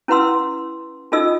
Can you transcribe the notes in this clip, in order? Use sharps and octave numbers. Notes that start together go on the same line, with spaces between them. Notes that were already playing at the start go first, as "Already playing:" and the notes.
C#4 E4 B4 F#5 C6 E6
C#4 D#4 F4 A4 D#5 E6